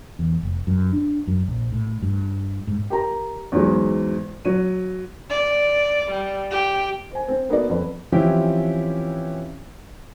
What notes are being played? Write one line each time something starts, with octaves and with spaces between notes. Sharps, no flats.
E2
F1
F#2
D4
F#2
A#1
A2
G2
G#2
G4 A#4 A#5
E2 G#2 F#3 G#3
F#3 D#7
D5
G3
G4
C5 G#5
C4
A#3 B3 D#4 F#4 A4 D5
F2 F3 B4 D5
E3 F3 C4 C#4 E4 G4